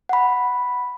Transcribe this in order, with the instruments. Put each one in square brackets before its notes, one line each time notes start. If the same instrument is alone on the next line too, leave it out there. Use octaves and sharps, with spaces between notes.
[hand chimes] F#5 B5